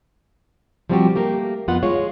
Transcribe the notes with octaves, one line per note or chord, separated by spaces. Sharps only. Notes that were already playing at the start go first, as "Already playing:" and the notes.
F3 G3 B3 C4 F#4 G4
A3 A#3 G4 A#4
F2 B3 F4 B4 F#5
G#3 F4 C#5